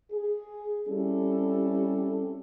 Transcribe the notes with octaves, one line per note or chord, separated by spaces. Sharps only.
G#4
G3 C4 C#4 E4 G4 A4